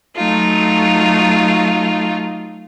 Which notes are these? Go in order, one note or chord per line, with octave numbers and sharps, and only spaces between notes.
F#3 A3 D#4 F4